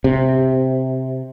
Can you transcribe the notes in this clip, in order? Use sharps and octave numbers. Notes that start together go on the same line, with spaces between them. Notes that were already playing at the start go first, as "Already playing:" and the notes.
C3